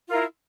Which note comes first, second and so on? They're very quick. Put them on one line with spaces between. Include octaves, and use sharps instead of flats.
F4 A#4 E4